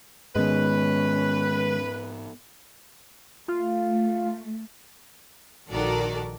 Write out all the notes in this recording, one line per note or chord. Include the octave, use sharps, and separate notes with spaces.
G#2 D#3 G#3 B3 C#4 B4
A3 F4
A#1 D#3 F#4 A4 A#4 D5